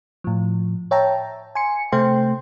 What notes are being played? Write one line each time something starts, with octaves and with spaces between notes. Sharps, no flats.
A2 F3
C#5 E5 G5 A5 A#5
G#5 C6 C#7
C3 A3 C5 G5 C6